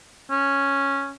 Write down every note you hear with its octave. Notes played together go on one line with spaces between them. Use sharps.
C#4